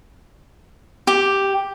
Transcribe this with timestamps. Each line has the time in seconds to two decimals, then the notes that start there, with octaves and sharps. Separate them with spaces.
1.07 G4